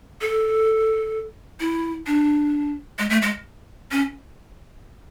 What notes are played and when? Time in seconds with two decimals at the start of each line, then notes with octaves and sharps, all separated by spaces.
0.21 A4
1.60 E4
2.07 D4
2.99 G#3
3.10 A3
3.22 G#3
3.91 C#4